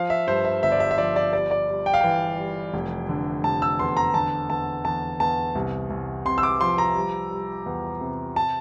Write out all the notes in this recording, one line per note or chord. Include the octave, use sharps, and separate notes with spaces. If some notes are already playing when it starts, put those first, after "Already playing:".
Already playing: F3 F5
E5
G2 C5
E5
G1 E5
D5
E5
E5
F3 D5
D5
G3 D5
D5
G3
G5
F5
E3 G5
G3
F1
D3
F1 A5
E6
E2 C6
A#5
D3 A5
E2 A5
E2 A5
E2 A5
C2
C2
C3 C6
E6
D6
F3 C6
A#5
G3
G3
E2
C3
A5